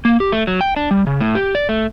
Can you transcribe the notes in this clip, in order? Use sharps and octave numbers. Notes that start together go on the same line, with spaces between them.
A#3
G4
A3
F#3
G5
D4
G3
C#3
A2
G4
D5
A3